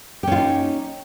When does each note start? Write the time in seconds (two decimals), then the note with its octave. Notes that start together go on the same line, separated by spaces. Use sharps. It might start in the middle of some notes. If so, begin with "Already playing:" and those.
0.23 G4
0.27 C#4
0.32 F4
0.36 D#4